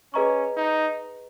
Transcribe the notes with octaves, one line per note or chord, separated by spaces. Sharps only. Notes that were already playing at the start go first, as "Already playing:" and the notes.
C#4 G#4 B4 D#5 A#5 C#6
D#4